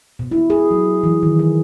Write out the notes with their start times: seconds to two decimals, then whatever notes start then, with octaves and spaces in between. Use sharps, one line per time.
0.19 B2
0.31 E4
0.50 G#4
0.71 F#3
1.03 E3
1.23 D#3
1.39 G#4